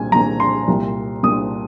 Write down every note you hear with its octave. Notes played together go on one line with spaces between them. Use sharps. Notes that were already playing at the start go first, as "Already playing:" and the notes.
Already playing: C2 A#2 G#5
C2 A#2 A#5
C6
C2 A#2
C2 A#2 D#6